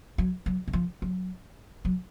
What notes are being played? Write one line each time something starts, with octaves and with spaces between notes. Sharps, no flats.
F#3
F#3
D#3
F3
F#3
F#3